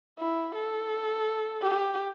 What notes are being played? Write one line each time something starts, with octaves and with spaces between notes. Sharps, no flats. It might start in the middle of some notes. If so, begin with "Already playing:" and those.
E4
A4
G4